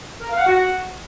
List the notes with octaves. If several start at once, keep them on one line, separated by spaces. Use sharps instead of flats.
A#4
F5
F#5
F#4